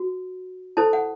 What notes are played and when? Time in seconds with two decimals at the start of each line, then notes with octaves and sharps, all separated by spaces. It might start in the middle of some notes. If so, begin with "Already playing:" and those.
Already playing: F#4
0.77 E4 A4 C5 A5
0.93 F#5